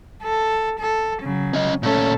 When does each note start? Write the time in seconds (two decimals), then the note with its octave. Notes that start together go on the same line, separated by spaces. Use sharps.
0.23 A4
0.79 A4
1.22 C#3 F#3
1.54 C#4 D#5
1.83 A#2 A3 C#4 A4